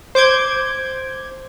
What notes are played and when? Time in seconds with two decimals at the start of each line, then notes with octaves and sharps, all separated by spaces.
0.15 C5 D6 G6 G#6